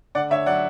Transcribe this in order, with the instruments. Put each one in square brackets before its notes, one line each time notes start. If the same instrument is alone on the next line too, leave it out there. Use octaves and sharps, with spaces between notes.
[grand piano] D3 D5 F#5
D3 C#5 E5
F#3 D5 F#5